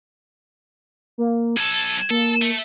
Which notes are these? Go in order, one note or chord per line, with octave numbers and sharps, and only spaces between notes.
A#3
B1 A4 G#6
A#3 A4
A3